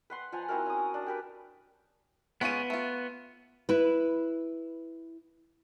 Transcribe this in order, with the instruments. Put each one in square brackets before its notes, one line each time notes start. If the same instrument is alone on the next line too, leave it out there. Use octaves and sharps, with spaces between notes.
[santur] B4 F#5 C6
F3 F#5 G#5 A#5
C4 E4 F#4 A#4
C#4 D#6
D4
G4 A#4 B4
[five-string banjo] G#3 C#4 F4 [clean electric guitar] B3 [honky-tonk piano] D7 D#7
[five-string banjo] A3 F4
[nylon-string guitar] E4 B4